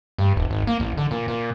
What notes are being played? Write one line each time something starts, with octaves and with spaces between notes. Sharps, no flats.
G2
D#1
G#1
A#3
A1
D3
A#2
A#2